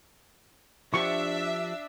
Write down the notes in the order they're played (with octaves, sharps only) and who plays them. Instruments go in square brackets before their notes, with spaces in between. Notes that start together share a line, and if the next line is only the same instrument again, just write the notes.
[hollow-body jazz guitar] F3 G4 [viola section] D4 [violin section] E5 [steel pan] C#6